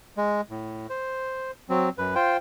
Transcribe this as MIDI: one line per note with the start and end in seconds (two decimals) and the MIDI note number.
0.17 0.41 56
0.50 0.87 45
0.90 1.51 72
1.69 1.89 54
1.69 1.89 60
1.98 2.15 42
1.98 2.15 71
2.15 2.37 65
2.15 2.37 72
2.15 2.37 79